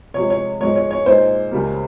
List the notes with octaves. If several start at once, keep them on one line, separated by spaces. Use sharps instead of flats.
C3 F3 G#3 C#5
C#5
G#2 F3 G#3 C#5
C#5
C#5
A#2 G#3 D#4 C5
C#2 C#3 G3 A#3